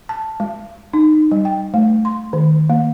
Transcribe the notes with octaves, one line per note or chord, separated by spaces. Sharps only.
A5
G#3
D#4
G3
G5
A3
C6
D#3
A#3